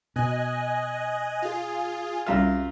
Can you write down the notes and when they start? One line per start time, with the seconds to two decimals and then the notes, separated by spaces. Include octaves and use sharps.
0.16 B2 D#5 G#5 F#6
1.42 F4 G#4
2.26 C2 F#2 G3 F4 E5